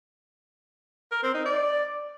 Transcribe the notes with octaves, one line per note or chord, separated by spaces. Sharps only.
A#4
C4
D#4
D5